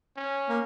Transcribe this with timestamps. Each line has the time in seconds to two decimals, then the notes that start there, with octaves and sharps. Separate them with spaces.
0.17 C#4
0.49 A#3